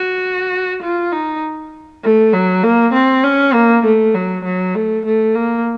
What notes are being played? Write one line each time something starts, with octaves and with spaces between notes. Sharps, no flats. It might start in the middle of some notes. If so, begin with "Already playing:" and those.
Already playing: F#4
F4
D#4
A3
F#3
A#3
C4
C#4
A#3
A3
F#3
F#3
A3
A3
A#3